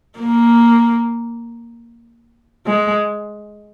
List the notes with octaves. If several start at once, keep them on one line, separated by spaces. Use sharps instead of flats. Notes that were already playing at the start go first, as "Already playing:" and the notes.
A#3
G#3